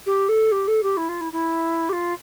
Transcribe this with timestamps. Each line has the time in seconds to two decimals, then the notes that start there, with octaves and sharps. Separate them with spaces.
0.06 G4
0.28 A4
0.51 G4
0.67 A4
0.83 G4
0.97 E4
1.08 F4
1.20 E4
1.32 E4
1.89 G4
1.92 F4